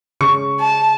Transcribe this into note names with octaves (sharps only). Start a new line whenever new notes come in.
C#3 C#4 G#4 C#6
A5